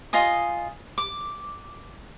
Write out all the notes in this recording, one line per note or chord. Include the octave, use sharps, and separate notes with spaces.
F4 D#5 G#5 D#6
D6